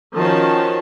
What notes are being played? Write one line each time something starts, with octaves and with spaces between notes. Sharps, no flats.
D#3 F3 C#4 F#4 C5 A5